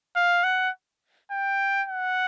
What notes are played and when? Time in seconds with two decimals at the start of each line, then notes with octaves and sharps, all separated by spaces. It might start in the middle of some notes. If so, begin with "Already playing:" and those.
0.16 F5
0.44 F#5
1.31 G5
1.88 F#5